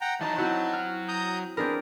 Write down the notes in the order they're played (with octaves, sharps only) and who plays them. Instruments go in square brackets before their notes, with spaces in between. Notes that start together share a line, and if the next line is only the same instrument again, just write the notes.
[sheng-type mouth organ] F#5 G5 A#5
[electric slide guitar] E3 F#3 A#5 [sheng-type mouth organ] D#4 A5
[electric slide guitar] F#3 [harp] C4 E4 F#4
[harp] F6
[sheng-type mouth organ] A#5 D#6 G6
[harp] C4 D4 A#4 [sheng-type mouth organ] G#4 B4